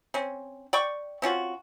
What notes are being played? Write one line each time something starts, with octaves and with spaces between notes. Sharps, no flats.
C4 C#4
D5 G5 C#6
C4 C#4 F4 F#4